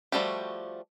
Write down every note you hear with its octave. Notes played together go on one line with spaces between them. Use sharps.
F3 G3 A3 F#4 G4